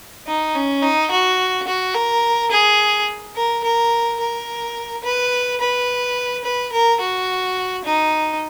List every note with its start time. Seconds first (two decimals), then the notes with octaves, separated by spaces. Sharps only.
0.27 D#4
0.55 C#4
0.83 D#4
1.11 F#4
1.67 F#4
1.95 A#4
2.51 G#4
3.36 A#4
3.64 A#4
4.20 A#4
5.04 B4
5.60 B4
6.44 B4
6.72 A#4
7.00 F#4
7.85 D#4